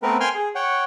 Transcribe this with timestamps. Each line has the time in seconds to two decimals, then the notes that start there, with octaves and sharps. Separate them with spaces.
0.03 A3 B3 C4 A#4 B4
0.20 G5 G#5 C6 F6
0.34 G#4
0.55 C#5 F#5 G5